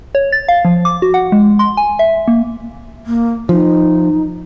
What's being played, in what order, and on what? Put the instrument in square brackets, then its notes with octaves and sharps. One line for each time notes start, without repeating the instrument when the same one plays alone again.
[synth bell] C#5
A6
F5
F3
D6
F#4
F#5
G#3
C6
G#5
E5
A#3
[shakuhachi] A#3
[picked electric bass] F3 [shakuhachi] D#4